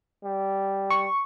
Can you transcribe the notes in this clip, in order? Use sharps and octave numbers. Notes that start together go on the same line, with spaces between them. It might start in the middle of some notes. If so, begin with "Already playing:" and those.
G3
C#6